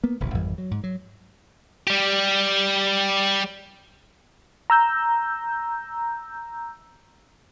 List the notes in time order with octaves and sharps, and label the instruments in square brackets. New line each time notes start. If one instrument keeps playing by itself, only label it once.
[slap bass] A#3 B3
D1 A1 B2
G#1 F2 E3 G3
F#3
G#2
F#3
[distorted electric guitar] G3 G4
[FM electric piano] A#5 E6 G6